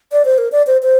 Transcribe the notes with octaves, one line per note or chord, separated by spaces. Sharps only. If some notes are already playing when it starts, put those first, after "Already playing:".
D5
C5
A#4
D5
C5
C5